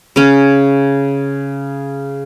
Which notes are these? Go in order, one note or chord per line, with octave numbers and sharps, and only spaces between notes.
C#3 C#4